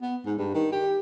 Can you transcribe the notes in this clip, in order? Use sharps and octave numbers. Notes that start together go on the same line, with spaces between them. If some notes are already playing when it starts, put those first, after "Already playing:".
B3
G#2
G2
D#3
G4